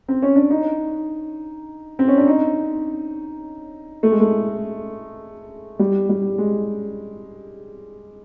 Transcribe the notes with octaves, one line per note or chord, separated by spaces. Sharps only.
C4
C#4
D4
D#4
C4
C#4
D4
D#4
A3
G#3
A3
G3
G3
G#3